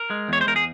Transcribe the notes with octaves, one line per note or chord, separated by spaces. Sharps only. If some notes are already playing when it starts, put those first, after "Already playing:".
Already playing: A#4
G#3
E2 C#5
C5
E2 A#4
G#4